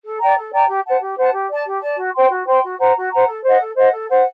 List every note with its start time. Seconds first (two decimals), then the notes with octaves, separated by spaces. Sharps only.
0.03 A4
0.19 D5 G5 A#5
0.35 A4
0.52 D5 G5 A#5
0.67 G4
0.84 C5 F#5 A5
1.00 G4
1.17 C5 F#5 A5
1.33 G4
1.49 D5 A5
1.65 G4
1.81 D5 A5
1.97 F#4
2.14 C5 G5 C6
2.30 F#4
2.47 C5 G5 C6
2.62 F#4
2.79 C5 F#5 A#5
2.95 F#4
3.12 C5 F#5 A#5
3.27 A4
3.43 C5 D#5 F#5
3.59 A4
3.76 C5 D#5 F#5
3.92 A4
4.09 C5 F#5